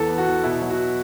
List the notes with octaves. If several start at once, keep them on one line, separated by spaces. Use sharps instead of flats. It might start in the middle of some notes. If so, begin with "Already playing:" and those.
Already playing: E2 E3 A4
B3
F#4
E2
B2 E4
F#3
F#4